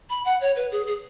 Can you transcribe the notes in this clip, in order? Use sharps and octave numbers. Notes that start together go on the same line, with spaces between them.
B5
F#5
C#5
B4
G#4
G#4